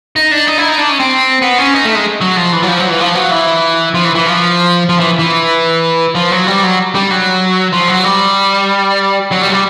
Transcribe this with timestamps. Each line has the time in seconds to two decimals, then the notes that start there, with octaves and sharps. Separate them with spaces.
0.16 D#4
0.31 D4
0.47 D#4
0.58 E4
0.69 D#4
0.78 D4
0.89 C#4
1.00 C4
1.42 B3
1.58 C#4
1.74 D#4
1.84 A3
1.95 G#3
2.21 F#3
2.36 F3
2.52 E3
2.62 F#3
2.68 F3
2.79 F#3
2.89 E3
3.00 F3
3.15 F#3
3.31 E3
3.94 F3
4.05 E3
4.15 E3
4.26 F3
4.89 F3
5.00 E3
5.19 E3
6.15 F3
6.31 F#3
6.47 G3
6.63 F#3
6.95 G3
7.11 F#3
7.73 F3
7.89 F#3
8.05 G3
9.31 F#3
9.41 G3
9.47 F#3
9.52 G3